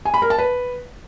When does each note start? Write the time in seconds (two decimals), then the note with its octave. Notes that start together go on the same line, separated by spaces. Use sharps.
0.05 G#5
0.14 B5
0.22 A#4
0.30 A5
0.38 B4